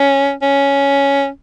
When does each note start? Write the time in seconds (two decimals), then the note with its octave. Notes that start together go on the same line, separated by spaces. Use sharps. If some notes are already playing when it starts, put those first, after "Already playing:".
Already playing: C#4
0.42 C#4